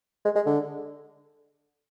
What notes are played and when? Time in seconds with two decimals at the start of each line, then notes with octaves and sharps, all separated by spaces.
0.25 G#3
0.36 G#3
0.46 D3